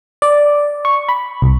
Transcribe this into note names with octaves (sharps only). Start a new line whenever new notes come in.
D5
C#6
B5
C2